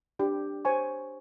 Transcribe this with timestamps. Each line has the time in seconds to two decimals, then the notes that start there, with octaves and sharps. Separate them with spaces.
0.19 D4 G4
0.65 C5 C#5 G#5 C#6